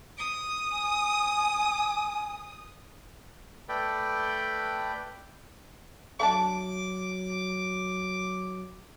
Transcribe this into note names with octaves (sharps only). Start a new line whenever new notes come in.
D#6
G#5
A3 A4 B4 D5 G5
F#3 A3 D4 A5 D6